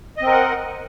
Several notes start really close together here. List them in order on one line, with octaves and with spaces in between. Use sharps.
D#5 C4 A#4 F#5